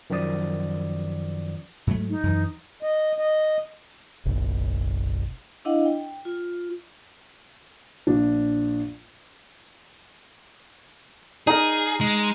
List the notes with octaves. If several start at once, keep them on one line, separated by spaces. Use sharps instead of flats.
F#2 D#3 F3 D5 D#6
G#2 F#3 A3
D#4
F#2 E3
D#5
D#5
F#1 B1
D4 E4 D#5 F5 F#5
G5
F4
A#1 D4
D#4 G#4 A#4
G#3